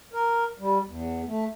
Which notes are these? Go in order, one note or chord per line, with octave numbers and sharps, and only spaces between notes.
A#4
G3
E2
A3